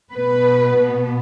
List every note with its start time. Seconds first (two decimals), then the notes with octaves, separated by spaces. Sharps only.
0.12 B2 B3 B4